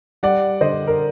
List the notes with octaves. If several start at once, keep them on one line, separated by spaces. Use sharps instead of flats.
G3 D5 F#5
D3 C5 D#5
A#4